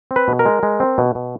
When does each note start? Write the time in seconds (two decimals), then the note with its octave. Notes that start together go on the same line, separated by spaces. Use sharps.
0.11 C4
0.16 B4
0.28 B2
0.39 A#4
0.46 G#3
0.63 G#3
0.80 C4
0.98 B2
1.15 B2